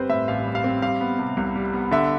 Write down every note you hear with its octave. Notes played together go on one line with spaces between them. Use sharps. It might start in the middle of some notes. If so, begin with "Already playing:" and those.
Already playing: G1 G3 C4 B4 C5
A2 E5
A1 F5
G3
F5
C4
G3 F5
B3
C3
C2
G3
B3
D3 E5